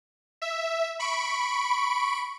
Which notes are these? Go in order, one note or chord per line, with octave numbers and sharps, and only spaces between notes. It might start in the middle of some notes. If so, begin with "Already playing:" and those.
E5
B5 C#6 D7